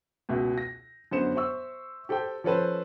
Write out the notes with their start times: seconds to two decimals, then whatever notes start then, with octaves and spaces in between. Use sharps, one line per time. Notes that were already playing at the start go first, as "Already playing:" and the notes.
0.29 C#2 B2 E5
0.58 A#6
1.11 F#2 D3 B3 C5 C#7 E7
1.35 C5 E5 C#6 E6
2.09 G4 A4 C5 G5
2.44 F3 C#4 A4 B4 C5